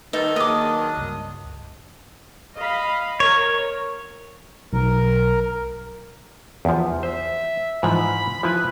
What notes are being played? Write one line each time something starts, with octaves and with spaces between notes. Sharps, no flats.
D#3 G3 D#4 A4 B4 E6
F#3 A#3 D4 G#4 D#5 D6 D#6
C#2 G2
D#5 F5 B5
A#4 C#5
B1 A#4
E2 F3
C5 E5
G#2 E3 F3 B5
F3 E4 B4 G#5